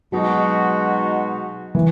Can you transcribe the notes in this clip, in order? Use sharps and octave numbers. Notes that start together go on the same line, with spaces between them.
B2 F#3 G#3 D#4 F#4
E3